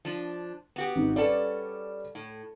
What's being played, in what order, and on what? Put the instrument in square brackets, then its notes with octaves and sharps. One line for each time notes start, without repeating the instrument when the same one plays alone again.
[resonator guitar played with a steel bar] F3 D4
B3 F#4 G4
[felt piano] G#1 D#4
[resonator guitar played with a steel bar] G3 C#4 A4 [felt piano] B4 D5
[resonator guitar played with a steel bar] A2